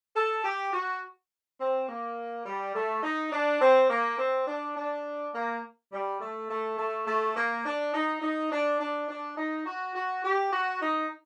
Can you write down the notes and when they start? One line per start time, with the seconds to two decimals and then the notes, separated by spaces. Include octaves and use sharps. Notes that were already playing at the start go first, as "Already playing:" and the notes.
0.15 A4
0.44 G4
0.73 F#4
1.60 C4
1.88 A#3
2.46 G3
2.74 A3
3.03 D#4
3.32 D4
3.61 C4
3.89 A#3
4.18 C4
4.47 D4
4.77 D4
5.34 A#3
5.92 G3
6.21 A3
6.50 A3
6.78 A3
7.07 A3
7.35 A#3
7.65 D4
7.94 D#4
8.22 D#4
8.51 D4
8.80 D4
9.09 D4
9.37 D#4
9.66 F#4
9.95 F#4
10.24 G4
10.53 F#4
10.81 D#4